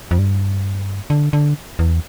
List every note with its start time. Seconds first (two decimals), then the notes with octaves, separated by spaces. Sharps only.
0.11 F2
0.19 G2
1.10 D3
1.33 D3
1.79 E2